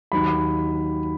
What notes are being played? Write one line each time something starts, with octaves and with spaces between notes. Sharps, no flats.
D#2 D#3 F#3 B5